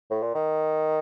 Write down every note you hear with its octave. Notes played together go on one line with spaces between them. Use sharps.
A2
A#2
D#3